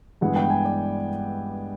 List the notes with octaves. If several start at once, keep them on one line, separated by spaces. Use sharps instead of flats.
G2 E3 G#3 B3 E4 F#5
G5
G#5
D5